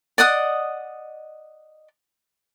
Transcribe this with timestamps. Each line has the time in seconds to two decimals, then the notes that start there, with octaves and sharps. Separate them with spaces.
0.18 D5 D#5 F#5 D#6